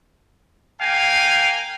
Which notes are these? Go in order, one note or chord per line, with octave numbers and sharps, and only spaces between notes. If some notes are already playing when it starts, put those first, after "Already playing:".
A#3 F5 G5 G#5